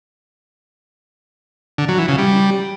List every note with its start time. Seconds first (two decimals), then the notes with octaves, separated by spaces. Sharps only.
1.78 D3
1.88 F#3
1.98 E3
2.08 C#3
2.18 G3